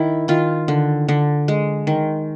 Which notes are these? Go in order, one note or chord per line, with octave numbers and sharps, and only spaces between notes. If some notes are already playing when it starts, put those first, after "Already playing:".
Already playing: D#3 E4
D#3 F4
D3
D3
G#3
D#3